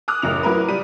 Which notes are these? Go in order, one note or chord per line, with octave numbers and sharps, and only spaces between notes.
D6 D#6 F6 F#6
A1 F#2 C#3 F7
F#3 E4 A#4 B4
G3 D#7